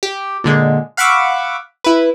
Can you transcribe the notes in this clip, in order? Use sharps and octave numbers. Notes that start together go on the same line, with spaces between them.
G4
A#2 D3 G#3
F5 F#5 B5 C#6 D6 E6
E4 B4